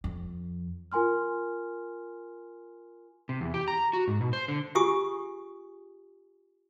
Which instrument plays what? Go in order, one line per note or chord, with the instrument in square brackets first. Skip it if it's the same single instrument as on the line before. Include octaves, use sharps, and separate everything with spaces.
[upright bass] F2
[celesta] F4 A#4 G#5 C6 F6
[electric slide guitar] C3
E2
G4
A#5
F#4
G#2
B2
C5
D3
[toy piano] F4 G4 G#4 G#5 C#6 D#6